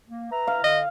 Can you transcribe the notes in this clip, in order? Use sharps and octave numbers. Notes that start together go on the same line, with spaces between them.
A#3
B4 E5 A#5
F5
D3 D#5